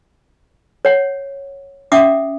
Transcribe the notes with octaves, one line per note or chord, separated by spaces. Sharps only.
C#5 F#5
C#4 E5 F#5 D6 D#6